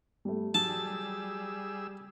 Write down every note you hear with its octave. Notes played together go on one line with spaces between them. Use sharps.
G3 A3
F#3 G3 G#4 A5 E6